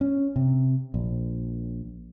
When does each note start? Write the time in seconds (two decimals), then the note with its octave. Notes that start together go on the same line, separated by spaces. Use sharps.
0.01 C#4
0.36 C3
0.94 A#1